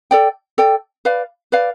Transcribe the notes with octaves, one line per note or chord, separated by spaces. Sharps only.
A4 D5 G5
A4 D5 G5
B4 D5 F5
B4 D5 F5